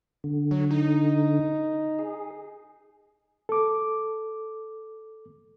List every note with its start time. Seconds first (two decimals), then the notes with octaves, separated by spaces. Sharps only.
0.24 D3
0.51 F#3
0.71 D#4
1.99 G#4
3.49 A4 D6